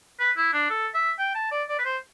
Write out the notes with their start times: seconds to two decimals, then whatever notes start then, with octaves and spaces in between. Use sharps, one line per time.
0.19 B4
0.37 E4
0.53 D4
0.70 A4
0.94 E5
1.19 G5
1.35 A5
1.51 D5
1.69 D5
1.78 B4
1.85 C5